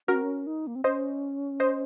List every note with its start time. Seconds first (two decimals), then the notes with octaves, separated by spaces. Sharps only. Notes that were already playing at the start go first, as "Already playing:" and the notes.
0.08 C#4 F#4 A#4
0.15 C4
0.22 C#4
0.47 D#4
0.67 A#3
0.75 C4
0.84 C#4 C5 D#5
1.60 C5 D#5